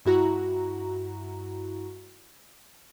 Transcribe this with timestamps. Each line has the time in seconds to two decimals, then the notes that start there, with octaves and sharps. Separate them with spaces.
0.05 G2 E4 F#4 A#5